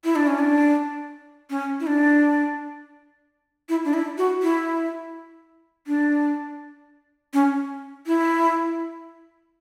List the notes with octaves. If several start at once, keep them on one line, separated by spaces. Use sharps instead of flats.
E4
D4
C#4
D4
C#4
E4
D4
E4
D4
E4
F#4
E4
D4
C#4
E4